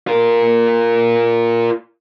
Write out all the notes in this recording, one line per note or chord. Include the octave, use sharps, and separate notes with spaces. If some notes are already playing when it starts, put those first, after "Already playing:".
F4 A#4